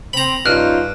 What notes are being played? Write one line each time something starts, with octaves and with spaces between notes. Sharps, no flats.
C4 A#5 B5
G2 C#4 D#4 F4 F6 F#6